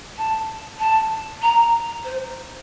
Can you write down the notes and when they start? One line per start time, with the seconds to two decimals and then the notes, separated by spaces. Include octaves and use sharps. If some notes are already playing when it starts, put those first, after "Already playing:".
0.17 A5
0.79 A5
1.42 A#5
2.04 C5